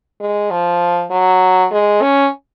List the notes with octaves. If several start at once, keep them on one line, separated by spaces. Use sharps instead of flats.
G#3
F3
F#3
G#3
C#4